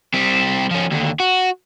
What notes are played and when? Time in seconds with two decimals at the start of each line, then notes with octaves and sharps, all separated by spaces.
0.14 G3 C4
0.71 F3 C#4
0.91 D#2 D3
1.20 F#4